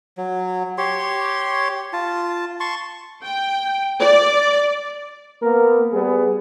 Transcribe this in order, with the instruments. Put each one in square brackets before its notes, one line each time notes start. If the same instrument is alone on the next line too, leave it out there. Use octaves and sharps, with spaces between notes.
[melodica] F#3
G4 C#5 C6
F4 A5
A5 C6 C#6
[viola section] G5
D5
[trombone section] A#3 B3 A#4
G3 B3 G#4